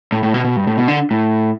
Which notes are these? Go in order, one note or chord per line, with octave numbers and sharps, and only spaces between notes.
A2
A2
B2
B2
G2
A2
B2
D3
A2